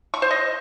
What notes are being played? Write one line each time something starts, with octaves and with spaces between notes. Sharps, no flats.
C#6
C5
D#5